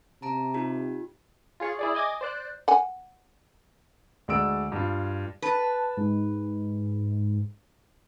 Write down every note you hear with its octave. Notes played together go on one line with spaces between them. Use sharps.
C3 A5 A#5 D7
D#4 F4 G4
F4 G#4 C#5
E4 G#4 D5
D#5 G#5 D6 A#6
C5 D5 F#6
F#5 G#5
D2 G#3 D5 E6 D7
G2 F4
B4 A5
G#2